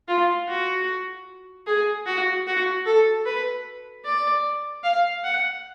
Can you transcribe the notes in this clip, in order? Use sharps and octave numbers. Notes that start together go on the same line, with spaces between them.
F4
F#4
G#4
F#4
F#4
A4
B4
D5
F5
F#5